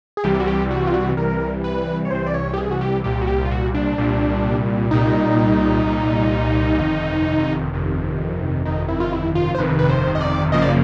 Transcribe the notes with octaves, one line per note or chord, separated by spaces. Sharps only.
G#4
C2 C3 E3 G3 G4
F#4
G4
F#4
F4
F#4
C2 C3 E3 G3 A#4
B4
C#5
C2 C3 E3 G3 C5
D5
C#5
G4
G#4
F#4
G4
C2 A#2 G3 G4
F#4
G4
F4
F#4
D4
C2 A#2 G3
C2 A#2 G3 D#4
C2 A#2 G3
G1 F2 C3 D#3
G1 F2 C3 D#3
G1 F2 C3 D#3 D#4
E4
F4
E4
F4
C5
G1 F2 C3 D#3 B4
B4
C5
D#5
D5
G#1 F#2 C#3 F3 A#3 D#5
D5